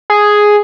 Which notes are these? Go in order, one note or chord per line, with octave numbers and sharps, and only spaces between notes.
G#4